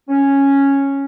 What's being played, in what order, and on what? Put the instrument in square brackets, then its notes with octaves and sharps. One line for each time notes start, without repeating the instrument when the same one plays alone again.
[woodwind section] C#4